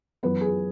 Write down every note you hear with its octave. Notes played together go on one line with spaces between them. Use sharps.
F#2 E3 B3 B4
G#4